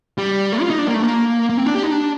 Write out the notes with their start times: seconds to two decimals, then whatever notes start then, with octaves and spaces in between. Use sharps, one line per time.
0.18 G3
0.53 A3
0.61 F4
0.70 D#4
0.79 D4
0.87 A#3
0.94 A3
1.02 A#3
1.49 A#3
1.57 C4
1.66 D4
1.75 G4
1.83 D#4
1.91 D4